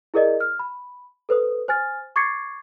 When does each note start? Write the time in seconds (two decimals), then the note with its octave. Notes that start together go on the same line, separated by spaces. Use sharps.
0.14 E4 G#4 A#4 D5 D#5
0.40 F6
0.59 B5
1.29 A4 B4 C5 D#6
1.68 C5 G#5 F6 A6
2.16 C#6 D6 G#6 A6 C7 C#7